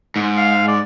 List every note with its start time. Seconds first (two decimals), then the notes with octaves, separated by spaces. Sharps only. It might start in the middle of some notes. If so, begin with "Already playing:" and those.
0.16 G#2
0.37 F5
0.68 D5